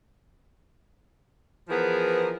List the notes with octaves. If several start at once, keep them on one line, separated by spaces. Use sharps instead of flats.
E3 F3 B3 G#4 A#4